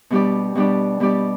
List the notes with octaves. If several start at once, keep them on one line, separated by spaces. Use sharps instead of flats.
B2 G3 D4 G4 D5
B2 G3 D4 G4 D5
B2 G3 D4 G4 D5